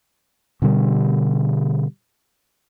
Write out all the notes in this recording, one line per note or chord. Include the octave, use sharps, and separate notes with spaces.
B2 D3 G3